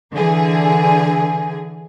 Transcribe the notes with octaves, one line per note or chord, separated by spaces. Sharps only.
D3 E3 G#4